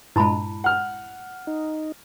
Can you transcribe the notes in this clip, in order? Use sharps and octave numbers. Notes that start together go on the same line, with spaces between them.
G2 A#2 G#3 E4 A5 B5
F#5 F6
D#4